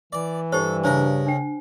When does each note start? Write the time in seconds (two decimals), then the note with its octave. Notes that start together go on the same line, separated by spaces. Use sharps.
0.13 E3 D5
0.52 G2 G4 A4 C5
0.84 C#3 D4 A#4 C5
1.26 D4 G5